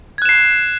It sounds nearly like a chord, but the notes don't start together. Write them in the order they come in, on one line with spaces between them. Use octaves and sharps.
G#6 F#6 E7 C7